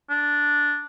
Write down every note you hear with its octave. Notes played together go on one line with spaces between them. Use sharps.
D4